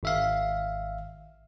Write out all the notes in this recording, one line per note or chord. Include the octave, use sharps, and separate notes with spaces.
G#1 E5 F5